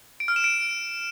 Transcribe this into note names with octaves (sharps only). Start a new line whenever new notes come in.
D7
F6
E7
D7